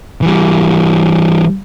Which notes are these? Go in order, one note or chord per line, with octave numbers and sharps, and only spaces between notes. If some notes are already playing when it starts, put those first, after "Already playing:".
E3 G3